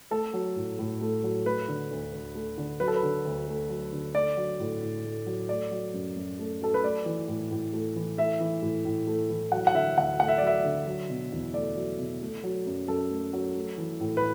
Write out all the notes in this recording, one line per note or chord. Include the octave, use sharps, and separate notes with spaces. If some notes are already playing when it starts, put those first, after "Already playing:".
A3 A4
F#3
A2
A2
A3
F#3
A3 B4
D3
D2
D2
A3
D3
F#3 B4
A4
B4
D3
D2
A3
F#3
D3
A3 D5
F#3
A2
A2
A3
F#3
A3 D5
F#3
F#2
F#2
A3
F#3 A4
B4
A3 D5
E3
A2
A2
A3
E3
A3 E5
E3
A2
A2
A3
E3
F#3 F#5
F#5
D3 E5
D2 F#5
A3 F#5
E5
D5
F#3 E5
D3
F#3
B2
E2
A3 D5
F#3
B2
A3
F#3
F#2
F#2 A4
A3
F#3
A3
E3
A2
B4